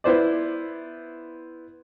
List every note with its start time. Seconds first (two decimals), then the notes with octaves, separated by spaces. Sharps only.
0.04 B3 E4 C5 D5